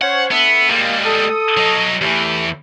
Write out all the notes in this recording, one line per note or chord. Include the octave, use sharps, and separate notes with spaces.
C#4 C5 C#5 F#5
A3 B3 D4 E5
G3 G#3 A#3
A4 D#6
F#3 D#4
E2 E3 A3 G4